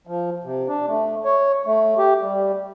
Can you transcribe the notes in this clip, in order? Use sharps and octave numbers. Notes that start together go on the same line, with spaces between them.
F3
C3
D4
A3
C#5
A3
G4
G3